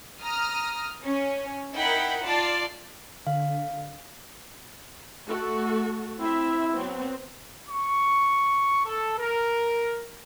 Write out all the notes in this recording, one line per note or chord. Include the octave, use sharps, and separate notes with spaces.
A#5 D#6 F6
C#4
D#4 E4 A#4 F#5 G5 B5
F4 D5 A5
D3 F5
A3 F#4 A4
C4 E4 E5
F#3 B3 C4
C#6
A4
A#4